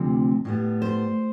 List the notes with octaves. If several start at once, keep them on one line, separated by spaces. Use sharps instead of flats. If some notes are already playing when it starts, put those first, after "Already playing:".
Already playing: D2 C3 F3 C4
A2 G3 B3
C5